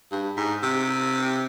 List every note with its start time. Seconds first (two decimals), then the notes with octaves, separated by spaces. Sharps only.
0.12 G2
0.37 G#2
0.63 C3